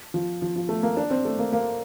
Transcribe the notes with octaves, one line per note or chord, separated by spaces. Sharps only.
F3
F3
F3
A3
A#3
D4
C4
A3
A#3
A#3